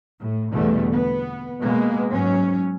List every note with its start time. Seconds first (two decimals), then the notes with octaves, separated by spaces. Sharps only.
0.19 A2
0.54 E2 B2 D3 G3 A3
0.91 B3
1.63 B2 G#3 A#3 B3
2.11 G#2 F#3 C#4